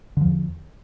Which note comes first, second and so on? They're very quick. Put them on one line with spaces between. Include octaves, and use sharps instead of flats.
D3 F3 E2